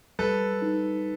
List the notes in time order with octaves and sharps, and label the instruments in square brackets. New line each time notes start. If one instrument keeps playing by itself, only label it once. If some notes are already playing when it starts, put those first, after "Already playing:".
[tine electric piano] G3 [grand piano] A4 B4
[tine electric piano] D#4